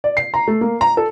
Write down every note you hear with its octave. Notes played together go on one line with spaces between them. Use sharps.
D5
C7
A#5
A3
A#3
A#5
A4